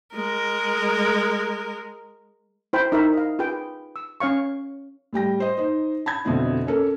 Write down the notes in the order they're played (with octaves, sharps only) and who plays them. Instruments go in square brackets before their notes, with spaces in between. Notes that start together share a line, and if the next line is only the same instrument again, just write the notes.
[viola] G#3 A#4
[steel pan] E4 C5 G5 B5
D#4 E4 A#4 E5 B5
D#5 F5
F4 G#4 B4 G5
E6
C#4 C#5 F5 C#6
[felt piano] A2 G3 G5 A#6
C5 D#5
D#4 C5 D#5
A5 B5 G#6
F2 B2 D3 C4 E4
C#4 A4 A#4